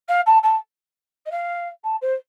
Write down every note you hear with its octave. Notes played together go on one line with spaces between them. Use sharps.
F5
A5
A5
D#5
F5
A5
C5